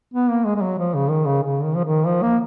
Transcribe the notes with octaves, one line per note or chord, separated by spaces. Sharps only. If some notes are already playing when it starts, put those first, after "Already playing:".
B3
A#3
G#3
G#3
F#3
F3
C#3
D#3
C#3
C#3
D#3
F3
D#3
F3
A#3